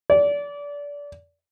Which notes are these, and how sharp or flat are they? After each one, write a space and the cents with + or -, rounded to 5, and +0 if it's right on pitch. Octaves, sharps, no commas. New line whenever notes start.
D5 -25